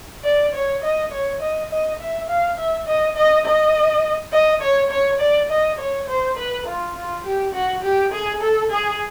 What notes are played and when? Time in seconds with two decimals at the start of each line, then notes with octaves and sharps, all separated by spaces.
0.24 D5
0.54 C#5
0.82 D#5
1.12 C#5
1.41 D#5
1.71 D#5
1.99 E5
2.28 F5
2.57 E5
2.87 D#5
3.16 D#5
3.45 D#5
4.32 D#5
4.61 C#5
4.90 C#5
5.20 D5
5.50 D#5
5.78 C#5
6.08 C5
6.37 B4
6.66 F4
6.95 F4
7.24 G4
7.53 F#4
7.82 G4
8.12 G#4
8.41 A4
8.70 G#4